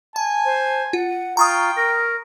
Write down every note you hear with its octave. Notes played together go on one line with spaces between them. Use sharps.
G#5 A5
C5
F4 F#5
F4 G5 A#5 C#6 D#6
A#4